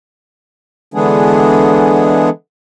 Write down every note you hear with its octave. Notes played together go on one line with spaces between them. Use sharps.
D3 E3 G#3 B3 D4 G#4